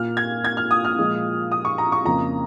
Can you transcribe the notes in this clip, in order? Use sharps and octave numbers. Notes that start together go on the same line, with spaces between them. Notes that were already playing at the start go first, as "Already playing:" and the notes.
Already playing: A#2 A#3 F6
G#6
G#6
F6
D#6
F6
A#2 F3 G#3
D#6
C#6
A#5
C#6
F2 C#3 A#3 A#5